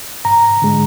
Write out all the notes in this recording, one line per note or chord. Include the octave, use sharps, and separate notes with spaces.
G2 A#5
D3 G#3